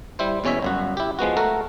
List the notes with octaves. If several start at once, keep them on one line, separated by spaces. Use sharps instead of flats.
G3 E4 C5
E2 B2 C#4 C#5 E5
G1 F#2 F#4
E4 G4
F3 G#3 B3 F#4
A3 F#4 A4 A#4